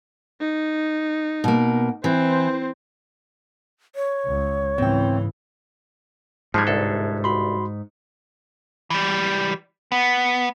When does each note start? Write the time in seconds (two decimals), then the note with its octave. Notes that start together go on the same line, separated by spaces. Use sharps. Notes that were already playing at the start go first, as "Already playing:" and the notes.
0.40 D#4
1.44 B2 A#3
2.04 E3 C4 C5
3.96 C#5
4.26 C#2
4.78 G#2 C#3 E3 B3 C4 G5
6.54 G#2 F3 G3 A5 F#6 G#6
6.67 G1 C2 A4
7.24 F#4 B5 C6
8.90 E3 G3
9.92 B3